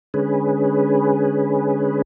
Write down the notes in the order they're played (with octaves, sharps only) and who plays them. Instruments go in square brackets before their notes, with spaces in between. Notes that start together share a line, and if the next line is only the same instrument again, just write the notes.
[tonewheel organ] D3 G#3 C#4 G#4 B4